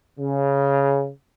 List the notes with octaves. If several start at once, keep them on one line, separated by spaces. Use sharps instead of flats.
C#3